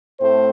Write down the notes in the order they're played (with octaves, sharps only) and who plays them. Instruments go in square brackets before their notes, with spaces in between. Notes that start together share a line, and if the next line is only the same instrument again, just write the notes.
[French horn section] A2 A3 C4 C5